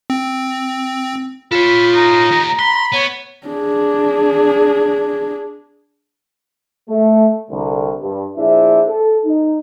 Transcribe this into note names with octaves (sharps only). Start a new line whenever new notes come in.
C4
F4 A4 C#5 B5
D#4 A#5
A#3 G4
B5 C6
B3 C#5
D4 G#4
A3
C2 D3
G2
A#1 D4 E4 G#4 C5 E5
A4
D#4